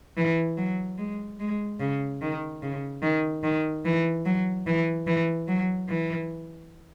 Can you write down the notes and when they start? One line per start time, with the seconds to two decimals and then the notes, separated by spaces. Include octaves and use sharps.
0.17 E3
0.57 F#3
0.98 G#3
1.40 G#3
1.80 C#3
2.21 D#3
2.63 C#3
3.02 D#3
3.43 D#3
3.85 E3
4.26 F#3
4.67 E3
5.07 E3
5.48 F#3
5.89 E3